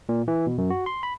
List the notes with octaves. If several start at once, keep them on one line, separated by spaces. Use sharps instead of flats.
A#2
E3
B2
F#2
F#4
C6
B5